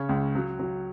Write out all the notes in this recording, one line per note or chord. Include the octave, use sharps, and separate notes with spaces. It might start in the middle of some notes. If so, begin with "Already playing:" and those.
Already playing: C#3 C#5
C#2
F#3
F#3